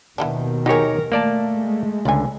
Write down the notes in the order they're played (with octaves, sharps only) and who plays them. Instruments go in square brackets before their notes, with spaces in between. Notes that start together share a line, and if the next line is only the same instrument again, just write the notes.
[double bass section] D#2 B2 D#3 [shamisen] E3 B3 D4
[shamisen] F#3 G#4 [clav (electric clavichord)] D#4 G4 C#5 [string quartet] A#4
[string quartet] A3 [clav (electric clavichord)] A#3 D5 A5
[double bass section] G#3
[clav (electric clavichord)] C#2 D3 [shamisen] D5 G#5